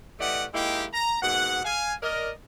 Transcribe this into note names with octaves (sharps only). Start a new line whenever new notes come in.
E3 A3 G4 D5 D#5 F#5
G#3 A#3 D#4 E4 G4
A#5
G#2 B2 A#3 F#5
F5 G#5
A#4 D5 D#5